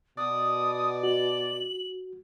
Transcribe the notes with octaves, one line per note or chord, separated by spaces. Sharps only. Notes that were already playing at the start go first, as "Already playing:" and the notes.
B2 D5 D#6
F#4 F#7